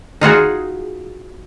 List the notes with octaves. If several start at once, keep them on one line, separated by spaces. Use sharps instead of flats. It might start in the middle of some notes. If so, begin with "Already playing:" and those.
D#4 F4 F#4 G#4